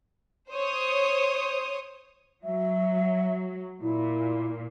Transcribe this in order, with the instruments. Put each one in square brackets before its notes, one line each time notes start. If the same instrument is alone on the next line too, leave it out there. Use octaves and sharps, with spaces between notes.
[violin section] C5 C#5 D#6
[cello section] F#3 [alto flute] E5
[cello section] A#2 [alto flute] E4